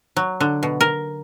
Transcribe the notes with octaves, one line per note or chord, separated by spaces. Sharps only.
F#3
D3
B2
A#4